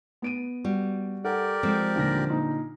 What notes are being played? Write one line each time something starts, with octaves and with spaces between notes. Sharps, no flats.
B3 D7 D#7
G3 F#4
G4 A4 A#4 D5 F#5
F3 G#3 C4
D#2 A#2 D3 A#6
A#2 D#4